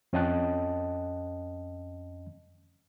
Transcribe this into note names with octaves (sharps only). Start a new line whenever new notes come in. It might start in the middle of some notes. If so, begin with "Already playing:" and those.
F2 C#4 D#5 G5 A5 F#6